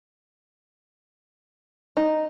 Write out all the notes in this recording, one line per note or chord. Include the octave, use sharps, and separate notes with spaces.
D#4